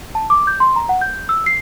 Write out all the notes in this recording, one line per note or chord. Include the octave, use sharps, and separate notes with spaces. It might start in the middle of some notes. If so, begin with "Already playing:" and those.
A5
D6
G6
C6
A#5
F#5
G6
E6
C7